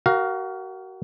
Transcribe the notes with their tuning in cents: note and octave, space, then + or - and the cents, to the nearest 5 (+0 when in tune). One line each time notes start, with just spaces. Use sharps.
F#4 +30 A#4 +0 F5 +5